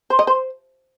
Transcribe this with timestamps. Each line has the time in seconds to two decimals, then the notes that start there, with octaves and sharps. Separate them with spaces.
0.10 C5
0.19 D#5
0.27 C5